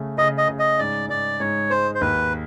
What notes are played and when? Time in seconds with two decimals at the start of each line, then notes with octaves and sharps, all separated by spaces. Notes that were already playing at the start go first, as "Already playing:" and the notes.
Already playing: C#3 A3
0.18 C#3 D#5
0.38 D#5
0.48 C#3
0.59 D#5
0.79 G#2 D5
1.09 G#2 D5
1.40 G#2 C#5
1.70 G#3 C5
1.95 C5
2.01 D#2 B4